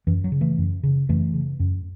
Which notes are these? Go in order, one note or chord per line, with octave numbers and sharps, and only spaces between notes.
F#2 E3
F#3
C#3
E3 A3
F#2
C#3
F#2 E3 A3
C#3
F#2